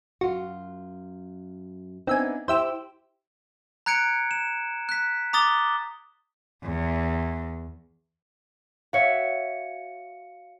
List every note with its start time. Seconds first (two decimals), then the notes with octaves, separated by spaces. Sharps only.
0.21 F#2 F4 F#4
2.07 B3 C4 D4 D#4 E5 G#5
2.48 E4 G4 C5 E5 G5 E6
3.86 A#5 F#6 G#6 C#7 D7
4.31 E7
4.89 F#6 B6
5.33 A#5 D6 D#6 A6 G7
6.64 E2
8.93 F#4 C#5 E5 F5 C#7